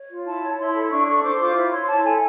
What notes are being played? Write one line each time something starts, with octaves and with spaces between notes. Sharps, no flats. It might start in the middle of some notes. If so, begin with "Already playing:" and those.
Already playing: C#5
F4
E4 A5
C#5
E4 C6
A4
D4 C#6
A4 C#6
C5 D6
F4 D6
E4
C#5 C6
E4 A5
A4 G#5